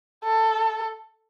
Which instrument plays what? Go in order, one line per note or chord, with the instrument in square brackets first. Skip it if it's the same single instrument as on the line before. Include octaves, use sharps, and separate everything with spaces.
[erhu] A4